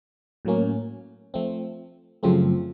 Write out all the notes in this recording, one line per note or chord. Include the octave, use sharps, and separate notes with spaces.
A2 F#3 A#3 C#4
F3 A3 C4
F#2 C#3 F3 A3 C4